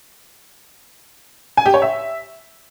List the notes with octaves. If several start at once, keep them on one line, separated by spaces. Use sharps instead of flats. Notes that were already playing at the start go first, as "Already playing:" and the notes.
G#5
G4
C#5
E5